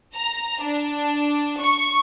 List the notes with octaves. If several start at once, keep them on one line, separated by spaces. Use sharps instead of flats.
A#5
D4
C#6